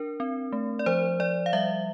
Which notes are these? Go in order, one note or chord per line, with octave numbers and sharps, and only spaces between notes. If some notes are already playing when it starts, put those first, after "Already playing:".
Already playing: D4 A#4
C4
A3
D5
F3 C5
F3 D5
F5
G3 E5